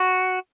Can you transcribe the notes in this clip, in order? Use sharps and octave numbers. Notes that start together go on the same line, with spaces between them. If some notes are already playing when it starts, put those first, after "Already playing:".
Already playing: F#4